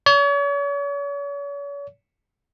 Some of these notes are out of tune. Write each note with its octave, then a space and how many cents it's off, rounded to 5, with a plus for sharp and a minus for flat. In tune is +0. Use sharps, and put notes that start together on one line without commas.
C#5 +40